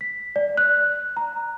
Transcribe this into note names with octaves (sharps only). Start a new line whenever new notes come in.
B6
D5
F#6
A#5